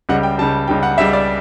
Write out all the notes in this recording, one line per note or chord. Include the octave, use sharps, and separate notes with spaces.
C#2 C#3 G3 F#5
G5
C#2 C#3 G3 A5
C#2 C#3 G3 G5
F#5
C#2 C#3 G3 E5
D5